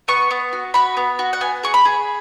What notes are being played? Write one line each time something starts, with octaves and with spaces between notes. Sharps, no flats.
B3 C#6
B3
F#4
F#4 B5
B3
F#4
F#5
B3 G#5
G#4 C#6
B5
G#4